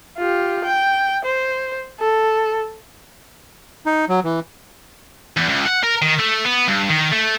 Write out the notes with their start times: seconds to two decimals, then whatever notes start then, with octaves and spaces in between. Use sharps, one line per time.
0.17 F4 G4
0.64 G5
1.25 C5
2.00 A4
3.86 D#4
4.09 F#3
4.24 E3
5.37 E2
5.49 C#2
5.67 F#5
5.84 A#4
6.02 D#3
6.19 A3
6.45 B3
6.68 G2
6.89 D#3
7.12 A3